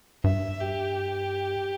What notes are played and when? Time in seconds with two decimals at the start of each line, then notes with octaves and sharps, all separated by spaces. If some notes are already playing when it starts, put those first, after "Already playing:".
0.24 G2 E5
0.61 G4